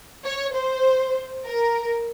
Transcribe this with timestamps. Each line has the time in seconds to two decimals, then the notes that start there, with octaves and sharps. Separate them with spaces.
0.25 C#5
0.54 C5
1.45 A#4